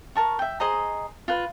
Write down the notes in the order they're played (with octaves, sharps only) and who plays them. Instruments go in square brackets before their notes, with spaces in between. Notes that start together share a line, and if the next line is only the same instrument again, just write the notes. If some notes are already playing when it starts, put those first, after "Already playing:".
[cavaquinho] A#4 A5 C#6
E5 G5
G#4 C5 D#5 A#5
F4 B4